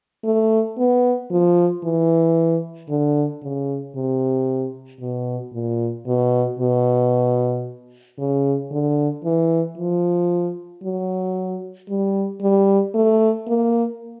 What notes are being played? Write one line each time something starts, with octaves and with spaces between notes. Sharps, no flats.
A3
B3
F3
E3
D3
C#3
C3
B2
A#2
B2
B2
C#3
D3
E3
F3
F#3
G3
G3
A3
A#3